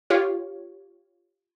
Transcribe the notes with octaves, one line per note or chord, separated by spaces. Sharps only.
F4 G4 C#5 F5